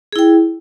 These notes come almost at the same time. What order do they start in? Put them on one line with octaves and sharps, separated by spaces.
G#4 E4 G5